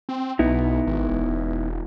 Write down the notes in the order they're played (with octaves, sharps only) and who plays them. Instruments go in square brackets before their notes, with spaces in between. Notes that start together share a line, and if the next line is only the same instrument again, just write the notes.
[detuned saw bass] C4
[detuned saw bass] B1 [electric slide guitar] B3 D#4 E4
[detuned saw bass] G#1
E1